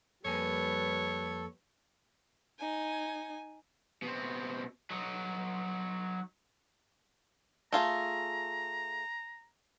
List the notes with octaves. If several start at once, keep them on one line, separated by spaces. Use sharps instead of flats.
F2 G3 A#3 A4 B4 C#5 G#5
D#4 G#5
B2 C4
F#3 D#4
A3 F4 G#4 A#5